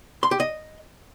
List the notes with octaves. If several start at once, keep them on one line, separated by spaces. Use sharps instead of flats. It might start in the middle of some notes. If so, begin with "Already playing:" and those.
C6
G4
D#5